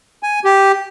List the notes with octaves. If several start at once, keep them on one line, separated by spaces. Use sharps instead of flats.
G#5
G4